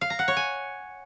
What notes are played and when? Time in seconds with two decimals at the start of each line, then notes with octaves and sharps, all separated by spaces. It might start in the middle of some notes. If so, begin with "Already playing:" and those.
0.01 F5
0.10 A#5
0.19 F#5
0.28 C#5
0.37 G#5